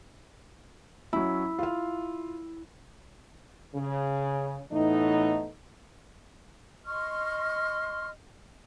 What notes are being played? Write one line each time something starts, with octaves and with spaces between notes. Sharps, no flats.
F#3 C#4 E4
F4 F5
C#3
A2 E3 A3 B3 D#4
D#5 C6 C#6 F6